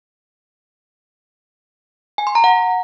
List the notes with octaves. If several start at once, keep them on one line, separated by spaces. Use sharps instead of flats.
G#5
C6
A#5
F#5